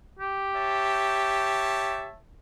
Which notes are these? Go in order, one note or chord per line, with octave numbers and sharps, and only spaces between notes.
G4
C#5 E5 A5